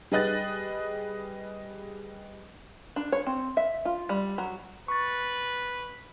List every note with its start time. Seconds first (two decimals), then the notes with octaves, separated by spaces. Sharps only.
0.12 G3 G#4 B4 D#5 F#6 A6
2.96 D4
3.12 C#5
3.27 C4
3.57 E5
3.85 F4
4.09 G3
4.38 F#3
4.88 B4 C#6 A6